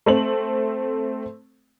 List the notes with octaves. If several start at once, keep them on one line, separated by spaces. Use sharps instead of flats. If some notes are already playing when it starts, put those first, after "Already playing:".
A3 C4 F#7